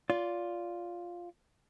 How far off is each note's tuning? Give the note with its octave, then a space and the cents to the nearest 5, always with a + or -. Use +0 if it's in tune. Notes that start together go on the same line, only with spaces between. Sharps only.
F4 +0 D5 -25